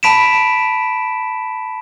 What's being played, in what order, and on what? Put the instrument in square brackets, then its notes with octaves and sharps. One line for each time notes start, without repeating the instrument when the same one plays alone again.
[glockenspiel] A5 B5 B6 D7 E7